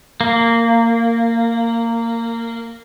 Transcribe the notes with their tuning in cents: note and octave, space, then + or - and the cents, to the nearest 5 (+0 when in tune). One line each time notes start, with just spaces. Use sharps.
A#3 -15